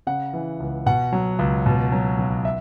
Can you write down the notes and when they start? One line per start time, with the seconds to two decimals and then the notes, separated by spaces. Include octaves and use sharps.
0.07 C#3 F#5
0.33 E3
0.60 C#2
0.86 B2 F#5
1.12 F#3
1.39 C#2
1.66 B2
1.92 F#3
2.19 B1
2.45 E5